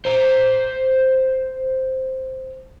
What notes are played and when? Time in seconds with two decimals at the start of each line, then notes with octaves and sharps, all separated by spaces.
0.05 C5 A#5